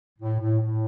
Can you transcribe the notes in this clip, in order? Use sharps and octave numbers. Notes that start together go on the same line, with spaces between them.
A2
A2
A2